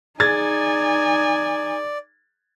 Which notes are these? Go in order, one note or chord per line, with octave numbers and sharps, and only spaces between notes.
D#4 G#4 D5 G#5 G#6 A6